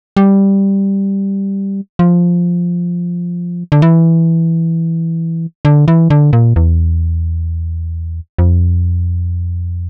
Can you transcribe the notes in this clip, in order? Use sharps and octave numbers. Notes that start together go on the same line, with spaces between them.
G3
F3
D3
E3
D3
E3
D3
A#2
E2
F2